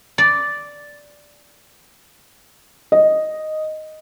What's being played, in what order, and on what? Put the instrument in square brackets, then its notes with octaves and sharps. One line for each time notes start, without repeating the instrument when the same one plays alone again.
[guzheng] D5
[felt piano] D#5